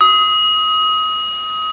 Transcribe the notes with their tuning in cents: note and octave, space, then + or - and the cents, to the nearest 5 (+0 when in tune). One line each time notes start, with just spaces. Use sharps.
D#6 +25